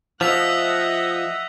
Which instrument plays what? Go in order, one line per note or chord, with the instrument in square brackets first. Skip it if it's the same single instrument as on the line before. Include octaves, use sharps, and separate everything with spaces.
[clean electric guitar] F3 [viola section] D#5 E5 F#5 [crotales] E6 B6 F7